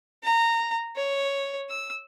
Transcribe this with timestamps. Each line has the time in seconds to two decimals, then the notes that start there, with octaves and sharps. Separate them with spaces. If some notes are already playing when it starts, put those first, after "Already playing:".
0.23 A#5
0.96 C#5
1.69 E6